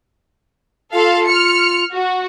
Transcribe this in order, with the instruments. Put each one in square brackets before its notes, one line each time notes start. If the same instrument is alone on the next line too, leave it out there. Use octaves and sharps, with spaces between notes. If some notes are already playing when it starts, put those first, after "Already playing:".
[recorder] F4 [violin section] A4 F5
[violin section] F6 C#7
F#4